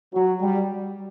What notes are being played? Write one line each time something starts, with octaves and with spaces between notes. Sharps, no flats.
F#3
G3